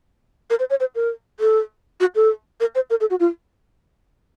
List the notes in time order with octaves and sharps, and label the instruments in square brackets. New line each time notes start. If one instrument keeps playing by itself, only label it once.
[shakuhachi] A#4
C5
C#5
C5
A#4
A4
F#4
A4
A#4
C5
A#4
A4
F#4
F4